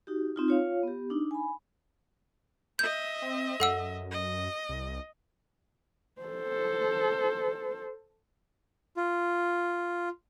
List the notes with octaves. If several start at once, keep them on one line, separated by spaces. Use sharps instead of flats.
D#4 F#4 G4
C4 D#4 F4
F4 C#5 F5
B3 G4
D4 D#4
G#5 B5
D#5 E5 G6
C4
F#2 A4 F#5 E6
D#5
C2
A4 C5
F4